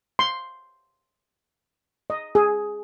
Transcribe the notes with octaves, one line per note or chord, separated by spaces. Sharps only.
C6
D#5
G#4